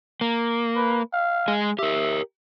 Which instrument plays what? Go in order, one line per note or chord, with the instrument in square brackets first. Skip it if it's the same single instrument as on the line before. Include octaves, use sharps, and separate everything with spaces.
[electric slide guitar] A#3
[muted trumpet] B4
F5
[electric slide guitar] G#3 G#4
[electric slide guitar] G4 A#4 [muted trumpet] E5